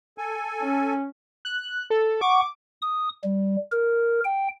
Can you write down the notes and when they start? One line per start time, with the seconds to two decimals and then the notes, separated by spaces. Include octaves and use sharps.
0.18 A4 G#5
0.61 C#4
1.45 F#6
1.90 A4
2.21 F#5 C#6 D6
2.82 D#6
3.24 G3
3.72 A#4
4.25 G5